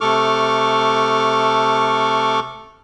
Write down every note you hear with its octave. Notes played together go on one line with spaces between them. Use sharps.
C3 A3 A4 C#6 D6 F6